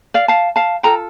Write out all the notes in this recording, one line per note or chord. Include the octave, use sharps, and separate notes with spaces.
D5 F5
F5 A5
F5 A5
F4 A4 G5 A#5